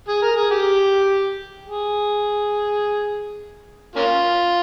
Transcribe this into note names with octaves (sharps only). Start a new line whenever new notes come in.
G#4
A#4
G#4
G4
G#4
A#3 C#4 F4